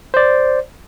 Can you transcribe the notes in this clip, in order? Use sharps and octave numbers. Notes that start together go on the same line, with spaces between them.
C5 D5